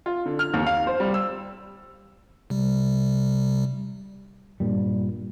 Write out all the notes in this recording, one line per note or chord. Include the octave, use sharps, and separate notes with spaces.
F4
D3
F6
D#2
F5
C5
G3
E6
C3 G3
G2 A#2 G3